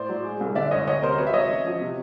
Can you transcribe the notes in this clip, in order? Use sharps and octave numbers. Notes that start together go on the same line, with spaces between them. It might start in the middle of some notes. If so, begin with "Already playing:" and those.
Already playing: A2 C5 D5
F#3
G#3
C2
D3 D5 E5
F#1 C#5 D#5
D2 C#5 D#5
C3 A#4 C5
F#3 B4 C#5
E5
F#3 C#5 D#5
A1
F3
C3